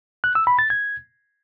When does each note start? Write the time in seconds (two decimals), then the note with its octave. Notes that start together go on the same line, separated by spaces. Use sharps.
0.24 F#6
0.35 E6
0.47 B5
0.59 A6
0.70 G#6